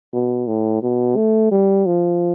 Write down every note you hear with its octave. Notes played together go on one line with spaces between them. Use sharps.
B2
A2
B2
A3
G3
F3